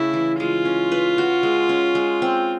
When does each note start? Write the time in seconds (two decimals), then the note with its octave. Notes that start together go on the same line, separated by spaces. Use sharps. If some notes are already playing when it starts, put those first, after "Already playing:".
Already playing: C#3 A3 E4
0.13 E3
0.39 G#3 F4
0.65 C#4
0.92 B4
1.18 F#4
1.43 G#3
1.69 C#4
1.95 G#3
2.22 C4